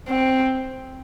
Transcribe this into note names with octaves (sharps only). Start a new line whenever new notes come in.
C4